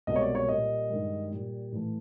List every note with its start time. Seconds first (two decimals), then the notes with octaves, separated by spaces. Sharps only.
0.07 C2 B2 G#3 D#5
0.16 C#5
0.22 D5
0.35 C#5
0.49 A#2 G3 D#5
0.90 G2 D#3 G#3
1.31 A#2 G3
1.72 A2 E3 A3